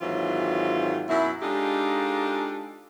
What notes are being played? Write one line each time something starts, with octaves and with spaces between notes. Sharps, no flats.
G#2 D#3 E3 F#3 C4 F4
F#2 B2 F#3 E4
G#3 D4 D#4 F4 G4 A4